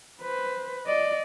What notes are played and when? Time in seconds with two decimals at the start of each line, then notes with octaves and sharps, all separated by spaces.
0.21 B4 C5
0.86 D5 D#5